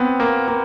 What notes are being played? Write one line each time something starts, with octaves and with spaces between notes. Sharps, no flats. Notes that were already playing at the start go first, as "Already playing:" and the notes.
Already playing: B3 C4
A#3
A#3